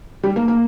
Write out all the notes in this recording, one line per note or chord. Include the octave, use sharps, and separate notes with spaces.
G3
A#3
A#3